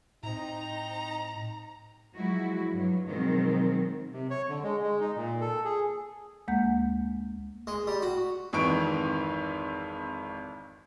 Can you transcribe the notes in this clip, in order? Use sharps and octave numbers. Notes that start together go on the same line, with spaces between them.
A2 C4 D#4 A#5
F3 F#3 G#3 E4 F#4
G2 F#3
B2 D#3 F3 F#3 G#3 C4
C3
C#5
D3
G#3
G#3
D#4
A#2
A4
G#4
D2 G#3 A#3 F#5 G6
G#3
G3
F#4
G#1 F2 D#3 E3 C#6 D7